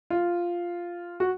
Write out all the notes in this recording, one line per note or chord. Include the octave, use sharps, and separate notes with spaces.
F4
F#4